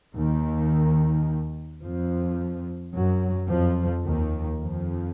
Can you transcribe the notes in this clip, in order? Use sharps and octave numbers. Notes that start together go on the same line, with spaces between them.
D#2 D#3
F2 F3
F#2 F#3
F2 F3
D#2 D#3
F2 F3